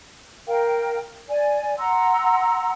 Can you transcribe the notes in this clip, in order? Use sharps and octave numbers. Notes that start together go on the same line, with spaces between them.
A#4 F5 G5
D5 G#5
F#5 A#5 C6 E6